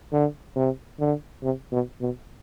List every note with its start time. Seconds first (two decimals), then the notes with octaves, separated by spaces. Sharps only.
0.12 D3
0.56 C3
1.00 D3
1.43 C3
1.72 B2
2.01 B2